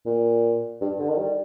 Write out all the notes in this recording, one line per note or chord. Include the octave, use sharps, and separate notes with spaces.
A#2
G2
D3
D#3
G3